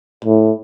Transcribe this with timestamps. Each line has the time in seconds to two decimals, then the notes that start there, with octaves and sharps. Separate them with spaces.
0.25 A2